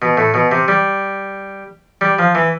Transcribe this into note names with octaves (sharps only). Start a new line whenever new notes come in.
B2
A2
B2
C3
G3
G3
F3
E3